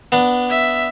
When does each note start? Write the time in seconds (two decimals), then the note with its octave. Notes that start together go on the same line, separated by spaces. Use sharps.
0.12 B3 D4
0.50 E5